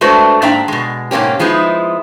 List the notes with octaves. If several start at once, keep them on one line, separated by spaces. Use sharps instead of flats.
G#3 A3 D4 F#4 B4 C5
G#2 A#3 D4 E5 G5 A#5
B2 G#3
G#2 B2 A#3 C#4 G4
F3 G#3 B3 D#4 E4